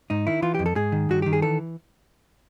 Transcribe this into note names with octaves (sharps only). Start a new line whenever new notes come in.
G#2 D#4
D#3 E4
E3 F4
F2 G4
A4
G#2 G#4
D#3
G2 F#4
D#3 G4
G#4
E3 A4